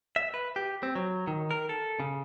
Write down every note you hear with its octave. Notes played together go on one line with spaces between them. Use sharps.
E5
B4
G4
C4
F#3
D#3
A#4
A4
C#3